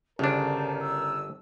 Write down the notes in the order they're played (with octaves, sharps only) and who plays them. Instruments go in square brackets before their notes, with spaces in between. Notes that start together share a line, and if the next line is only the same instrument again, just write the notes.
[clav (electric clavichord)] G1 D4 [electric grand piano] C#3 C#4 [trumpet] A#4 [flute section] C5 A5
[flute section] E6